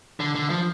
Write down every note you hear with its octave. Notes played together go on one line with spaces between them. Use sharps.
D3
D3
F3